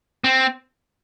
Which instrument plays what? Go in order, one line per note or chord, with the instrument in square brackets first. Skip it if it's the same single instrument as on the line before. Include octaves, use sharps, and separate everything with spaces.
[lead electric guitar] C4